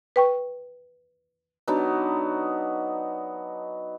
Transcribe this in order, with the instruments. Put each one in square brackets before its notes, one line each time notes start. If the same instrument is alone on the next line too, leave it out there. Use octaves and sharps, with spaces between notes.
[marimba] B4 G5 C#6
[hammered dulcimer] F#3 B3 D4 D#4